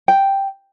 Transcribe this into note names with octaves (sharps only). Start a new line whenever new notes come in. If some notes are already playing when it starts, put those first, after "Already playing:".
G5